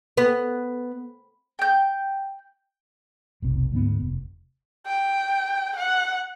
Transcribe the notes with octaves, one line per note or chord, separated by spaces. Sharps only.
B3
G5 G6
F1 B1 C3
D2 G#2 G#3 B3
F1
G5
F#5